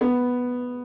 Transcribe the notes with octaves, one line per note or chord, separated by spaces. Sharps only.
B3